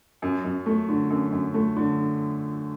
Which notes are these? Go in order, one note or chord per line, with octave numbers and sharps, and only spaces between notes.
F#2
F#2
A3
D3
F#2
F#2
A3
D3